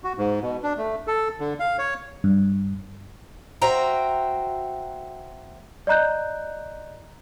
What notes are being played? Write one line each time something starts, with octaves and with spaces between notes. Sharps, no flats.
F#4
G#2
B2
D4
A3
A4
D3
F5
C#5
G2
F#4 C5 E5 G5 A#5
D5 D#5 A#5 F#6 G6